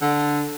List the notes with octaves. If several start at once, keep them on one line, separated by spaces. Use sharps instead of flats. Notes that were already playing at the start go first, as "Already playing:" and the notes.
D3